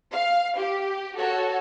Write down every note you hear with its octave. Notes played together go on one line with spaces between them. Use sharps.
F5
G4
F#4 A4 C#5